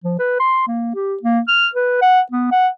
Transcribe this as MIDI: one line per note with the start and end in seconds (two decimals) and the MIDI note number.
0.04 0.14 53
0.19 0.39 71
0.39 0.62 84
0.67 0.90 58
0.95 1.16 67
1.22 1.40 58
1.48 1.67 89
1.75 1.98 71
2.02 2.21 78
2.32 2.49 59
2.51 2.68 78